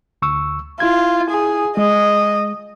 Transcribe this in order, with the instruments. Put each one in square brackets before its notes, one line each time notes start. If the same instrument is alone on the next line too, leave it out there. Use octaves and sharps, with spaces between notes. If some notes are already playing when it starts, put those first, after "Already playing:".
[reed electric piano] D2 C#6 E6
[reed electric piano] E4 G#6 [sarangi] F4
[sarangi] G#4
[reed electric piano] G#3 [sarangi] D#5